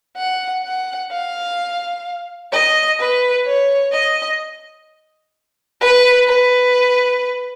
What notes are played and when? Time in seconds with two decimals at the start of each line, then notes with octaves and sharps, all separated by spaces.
0.17 F#5
0.64 F#5
1.12 F5
2.53 D#5
2.99 B4
3.46 C#5
3.92 D#5
5.81 B4
6.27 B4